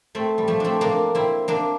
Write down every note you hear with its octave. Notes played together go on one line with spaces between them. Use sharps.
A3 C4
G3
F3 A3
A3 C4 D4
A#3 D4
C4 E4
A#3 D4